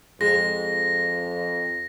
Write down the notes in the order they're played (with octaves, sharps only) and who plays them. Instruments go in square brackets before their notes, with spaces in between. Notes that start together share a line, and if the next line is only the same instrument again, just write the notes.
[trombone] F2 [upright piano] G#3 [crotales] A#6